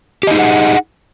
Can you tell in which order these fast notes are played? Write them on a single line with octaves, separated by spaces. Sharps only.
G4 D#5 D#4 G#4 F#5